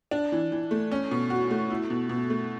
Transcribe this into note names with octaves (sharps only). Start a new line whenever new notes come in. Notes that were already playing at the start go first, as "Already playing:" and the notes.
D4
E3
E3
A3
C#4
B2
F#4
A3
E4
B2
B2
A3